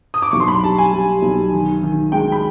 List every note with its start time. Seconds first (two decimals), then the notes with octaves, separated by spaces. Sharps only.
0.14 D#6
0.22 D6
0.31 B1 C#6
0.40 C6
0.48 B5
0.63 G3 A5
0.78 G#5
0.93 G3
1.22 B1
1.52 D#3
1.83 D#3
2.12 G#3 G5
2.32 B5